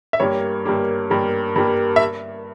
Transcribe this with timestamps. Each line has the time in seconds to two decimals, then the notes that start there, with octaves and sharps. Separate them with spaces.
0.13 E5
0.20 G2 G3 A#3 C#5
0.65 G2 G3 A#3
1.10 G2 G3 A#3
1.56 G2 G3 A#3
1.96 E5